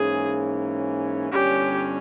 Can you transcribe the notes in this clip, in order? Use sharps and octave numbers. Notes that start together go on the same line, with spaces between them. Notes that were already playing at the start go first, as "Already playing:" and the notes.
Already playing: G#2 E3 A#3 C#4 G#4
G1 G2 G3 C#4 G4